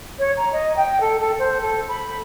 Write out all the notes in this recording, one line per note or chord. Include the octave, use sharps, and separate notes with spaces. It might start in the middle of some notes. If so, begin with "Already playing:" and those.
C#5
A#5
D#5
G5
A4
A4
C5
A4
B5